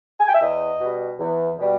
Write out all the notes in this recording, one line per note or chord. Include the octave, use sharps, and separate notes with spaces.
G#5
G5
E5
E2 D#5
B2 G3
E2
B2 G3